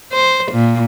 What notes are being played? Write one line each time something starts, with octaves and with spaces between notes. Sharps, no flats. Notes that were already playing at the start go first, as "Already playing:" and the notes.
C5
A#2